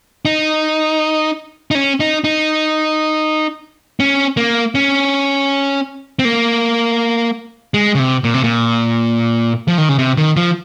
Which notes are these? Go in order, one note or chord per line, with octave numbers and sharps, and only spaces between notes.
D#4
D#4
C#4
D#4
D#4
C#4
A#3
C#4
C4
A#3
G#3
C#3
C3
A#2
C3
A#2
F3
D#3
C#3
C3
D#3
F3